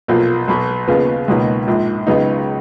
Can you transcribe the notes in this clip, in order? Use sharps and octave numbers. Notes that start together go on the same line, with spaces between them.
B1 A#2 F3 A#3
B1 B2 F#3
D#2 C#3 F3 B3
C#2 B2 F#3 A#3 D#4
A#1 G#2 F3
C#2 C#3 F#3 B3 D#4